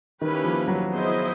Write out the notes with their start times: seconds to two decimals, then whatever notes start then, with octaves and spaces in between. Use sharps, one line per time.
0.22 D#3 A#3 C#4 E4 G4 B4
0.44 F3
0.68 F#3
0.90 B3 E4 G#4 C5 D#5